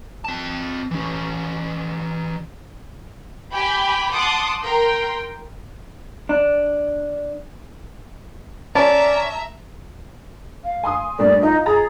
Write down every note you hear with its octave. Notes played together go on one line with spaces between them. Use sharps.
C4 A5
E3 C#4
G4 G5 G#5 B5
F#5 A5 C6 D6 D#6
A#4 G5 C6
D4
C#4 D5 E5 A5 A#5
F5
G#5 C6 D#6
G2 A#2 A3 D5
D#4 F4 D#5
G#4 A#5 A6